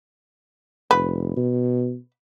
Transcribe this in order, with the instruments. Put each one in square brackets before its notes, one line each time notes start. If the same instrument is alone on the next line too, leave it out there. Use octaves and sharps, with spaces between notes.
[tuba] F1 [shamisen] B4
[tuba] B2